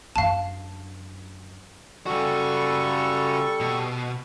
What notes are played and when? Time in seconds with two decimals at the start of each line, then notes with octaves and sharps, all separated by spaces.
0.16 F#2 D4 F5 A5
2.06 C#3 G3 F#4 A4 C#6
3.60 B2